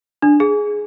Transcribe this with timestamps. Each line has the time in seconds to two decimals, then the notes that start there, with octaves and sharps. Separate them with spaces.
0.22 D4
0.40 G#4